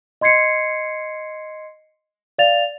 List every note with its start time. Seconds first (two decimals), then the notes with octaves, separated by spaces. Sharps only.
0.21 D#5 C6 G#6 C7 C#7
2.39 D5 F5 A6 F7